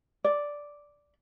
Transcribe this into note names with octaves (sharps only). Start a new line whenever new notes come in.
D5